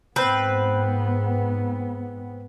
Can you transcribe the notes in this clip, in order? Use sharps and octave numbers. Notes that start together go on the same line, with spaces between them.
G#2 B3 C4 B4